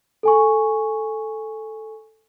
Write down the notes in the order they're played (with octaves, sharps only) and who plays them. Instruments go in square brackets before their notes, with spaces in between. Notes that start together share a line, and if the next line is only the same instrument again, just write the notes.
[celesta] A4 G#5 C#6